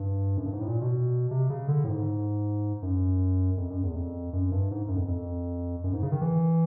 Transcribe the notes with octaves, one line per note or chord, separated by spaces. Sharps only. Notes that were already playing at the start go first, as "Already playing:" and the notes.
Already playing: G2
F#2
G2
G#2
A2
A#2
B2
C3
C#3
D3
A2
G#2
F#2
F2
F#2
E2
F2
F#2
G2
G#2
F#2
F2
F2
F#2
G#2
C#3
D#3
E3